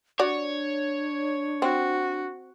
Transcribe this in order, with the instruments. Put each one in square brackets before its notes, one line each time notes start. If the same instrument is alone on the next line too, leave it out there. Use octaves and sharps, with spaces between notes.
[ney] D4 [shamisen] F#4 D5 [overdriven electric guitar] C#5
[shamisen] C4 [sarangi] F#4